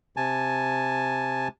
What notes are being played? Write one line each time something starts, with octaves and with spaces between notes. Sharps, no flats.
C3 G#5 A5